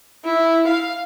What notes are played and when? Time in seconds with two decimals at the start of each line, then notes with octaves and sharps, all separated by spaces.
0.25 E4
0.68 F5